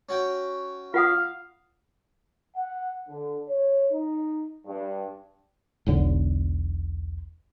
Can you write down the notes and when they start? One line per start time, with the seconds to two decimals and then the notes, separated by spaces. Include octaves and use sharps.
0.09 C#4 F#4 G5
0.94 F4 F5 F#5 D#6
2.56 F#5
3.08 D3
3.49 C#5
3.92 D#4
4.66 G2
5.87 E1 B1 D3